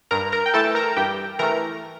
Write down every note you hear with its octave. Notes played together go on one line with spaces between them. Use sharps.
G2 A#4 A#5
A#4 A#5
G5
E3 A3 A4 A5
A#4 A#5
G2 G4 G5
E3 A3 A#4 A#5